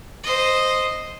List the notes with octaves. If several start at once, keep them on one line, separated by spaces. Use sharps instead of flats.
C5 D#5